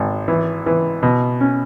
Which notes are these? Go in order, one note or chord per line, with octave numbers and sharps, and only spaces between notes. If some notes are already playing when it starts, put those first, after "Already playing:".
Already playing: G#1
E3
E3
B2
C#4